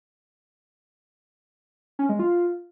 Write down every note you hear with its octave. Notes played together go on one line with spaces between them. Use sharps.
C#4
G#3
F4